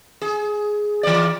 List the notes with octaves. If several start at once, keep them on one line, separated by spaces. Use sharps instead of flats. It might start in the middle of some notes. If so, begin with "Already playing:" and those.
G#4
E3 D5